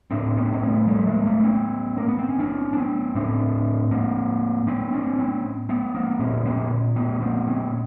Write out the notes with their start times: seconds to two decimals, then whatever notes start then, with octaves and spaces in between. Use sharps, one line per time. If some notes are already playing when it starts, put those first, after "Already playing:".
0.11 A2 C4 D4
0.37 B3 C#4
0.52 C4
0.62 A3 B3
0.87 G3 A3
1.06 G#3 A#3
1.26 A3 B3
1.44 B3 C#4
1.97 A#3
2.08 B3
2.19 C4
2.29 C#4
2.39 C4 D4
2.73 D4
2.77 B3 C#4
3.15 A2 C4 D4
3.91 A#3 C4
4.67 B3 C#4
4.93 C4 D4
5.19 B3 C#4
5.69 B3 C#4
5.95 A#3 C4
6.19 A#2 B3 C#4
6.45 B3 C#4
6.96 B3 C#4
7.21 A#3 C4
7.47 B3 C#4